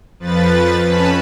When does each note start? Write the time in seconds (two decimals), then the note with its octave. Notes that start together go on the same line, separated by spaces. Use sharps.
0.20 F2 F3 B4 A6
0.86 F2 C#4 B4 A5 B5